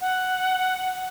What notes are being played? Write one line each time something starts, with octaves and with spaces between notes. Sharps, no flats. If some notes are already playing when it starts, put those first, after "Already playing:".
F#5